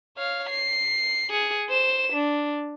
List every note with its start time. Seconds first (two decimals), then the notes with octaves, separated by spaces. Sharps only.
0.17 C#5 F5
0.49 C7
1.30 G#4 C#7
1.69 C5 E7
2.13 D4